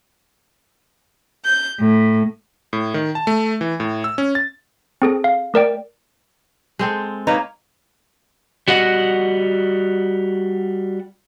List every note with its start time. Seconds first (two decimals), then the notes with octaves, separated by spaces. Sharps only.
1.44 G6
1.79 A2
2.73 A2
2.94 D#3
3.15 A5
3.27 A3
3.61 E3
3.80 A2
4.04 E6
4.18 C#4
4.35 A6
5.02 C4 G#4 A4
5.24 F5
5.54 A3 A#4 D5 G5
6.79 G#3 C4 A4
7.27 A#3 D#4 B4 C#5
8.68 G3 F#4 D#5 F#5